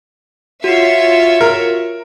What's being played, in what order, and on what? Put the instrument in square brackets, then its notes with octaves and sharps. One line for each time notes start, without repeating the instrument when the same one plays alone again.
[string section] F4 C#5 E5 [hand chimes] F#4 C7
[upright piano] A#4